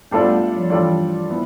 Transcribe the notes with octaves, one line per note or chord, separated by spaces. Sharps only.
G3 B3 D4 F4 A4 D5
A3
G3
F3
E3 G3 D4 F4 A4 D5
E3 B3